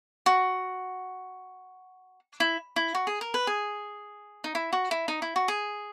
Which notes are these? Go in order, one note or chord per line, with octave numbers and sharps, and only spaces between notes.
F#4
E4
E4
F#4
G#4
A#4
B4
G#4
D#4
E4
F#4
E4
D#4
E4
F#4
G#4